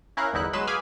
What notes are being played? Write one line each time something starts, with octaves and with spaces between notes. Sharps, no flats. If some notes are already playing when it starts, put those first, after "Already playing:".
C#4 E4 A#4 F5 F#6
G1 E2 D#4 E4 F#6
F#3 G#3 B4 C6 E7
G#4 F5 G#5 B5 D6